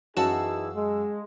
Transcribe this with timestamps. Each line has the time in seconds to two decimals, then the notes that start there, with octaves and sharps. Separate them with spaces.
0.17 F#2 E3 D#4 F#4 G#4 F5 A5 E6
0.76 G#3